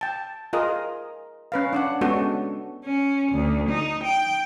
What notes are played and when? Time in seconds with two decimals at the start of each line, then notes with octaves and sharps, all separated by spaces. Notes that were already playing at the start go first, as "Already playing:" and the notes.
0.01 G5 A5
0.53 F4 G#4 A#4 D#5
1.52 C#4 B4 F5
1.73 D4 D5 F#5
2.01 G#3 B3 C#4 D4 F#4 A4
2.85 C#4
3.32 D2
3.70 D#4
4.04 G5